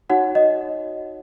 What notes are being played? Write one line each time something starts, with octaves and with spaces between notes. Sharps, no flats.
D#4 F#4 C#5 F#5
D#5